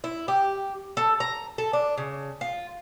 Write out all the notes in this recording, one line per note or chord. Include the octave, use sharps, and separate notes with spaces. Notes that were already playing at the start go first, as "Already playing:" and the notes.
E4
G4
A4
A#5
A4
D4
C#3
F4